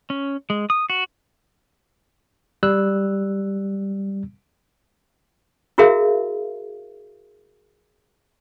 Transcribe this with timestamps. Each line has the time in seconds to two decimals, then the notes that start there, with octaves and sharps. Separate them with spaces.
0.10 C#4
0.50 G#3
0.70 D#6
0.90 F#4
2.63 G3 E6 F#6
5.78 E4 F#4 G#4 A#4 E5 F5